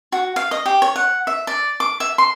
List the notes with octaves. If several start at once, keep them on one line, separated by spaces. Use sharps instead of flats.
F#4
F5
D#5
G4
C#5
F#5
E5
D5
D6
E5
C6